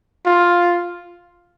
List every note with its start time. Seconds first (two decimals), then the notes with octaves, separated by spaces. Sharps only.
0.26 F4